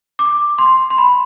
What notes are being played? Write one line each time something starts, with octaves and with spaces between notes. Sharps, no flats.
D6
C6
C6
B5